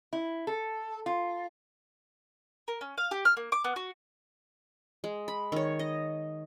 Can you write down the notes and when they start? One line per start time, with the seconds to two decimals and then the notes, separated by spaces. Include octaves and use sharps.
0.13 E4
0.47 A4
1.06 F4
2.68 A#4
2.81 C#4
2.98 F5
3.11 G4
3.25 F6
3.37 A#3
3.52 D6
3.64 B3
3.76 F#4
5.04 G#3
5.28 B5
5.52 D#3 C#5
5.79 D#5